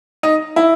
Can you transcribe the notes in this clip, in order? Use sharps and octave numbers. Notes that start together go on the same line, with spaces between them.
D#4
E4